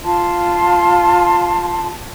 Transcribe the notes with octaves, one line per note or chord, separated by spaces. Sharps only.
F4 A5 C6